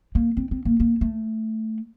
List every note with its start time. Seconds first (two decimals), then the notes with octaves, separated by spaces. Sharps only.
0.15 A#3
0.37 C4
0.51 C4
0.65 A#3
0.80 A#3
1.01 A3